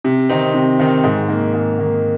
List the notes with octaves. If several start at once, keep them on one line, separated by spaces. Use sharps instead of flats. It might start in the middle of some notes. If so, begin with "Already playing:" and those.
C3
D#3 C4 D#4
C3
D#3 C4 D#4
G#2
D#3 A#3
G#2
D#3 A#3